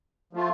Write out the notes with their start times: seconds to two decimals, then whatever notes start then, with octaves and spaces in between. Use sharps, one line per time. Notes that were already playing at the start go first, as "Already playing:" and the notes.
0.33 F3 A3 F4